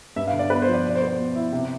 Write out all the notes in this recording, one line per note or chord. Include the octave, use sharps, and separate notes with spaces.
G2 E5
F5
D3
D5
B3 B4
C5
F3
D5
B2
D5
C5
B3
C5
B2
E4
C3